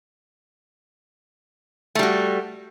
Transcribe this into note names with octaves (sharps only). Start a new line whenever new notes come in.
G3 A3 F#4